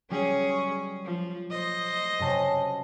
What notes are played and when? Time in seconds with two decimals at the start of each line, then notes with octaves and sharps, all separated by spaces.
0.11 F#3 G3 C#4 G#4
0.50 C#6
1.05 F3
1.51 C5 D#5
2.19 F#2 C3 A5